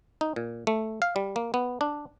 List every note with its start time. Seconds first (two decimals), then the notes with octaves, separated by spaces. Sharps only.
0.21 D#4
0.36 A#2
0.67 A3
1.02 F5
1.16 G3
1.36 A#3
1.54 B3
1.81 D4